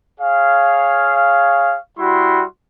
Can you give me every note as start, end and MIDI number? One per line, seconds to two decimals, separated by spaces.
0.20 1.77 68
0.20 1.77 73
0.20 1.77 77
1.98 2.43 55
1.98 2.43 64
1.98 2.43 66
1.98 2.43 84